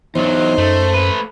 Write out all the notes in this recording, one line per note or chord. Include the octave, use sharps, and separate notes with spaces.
E2 F#3 D#4 C5
F#2 A3
A3 B4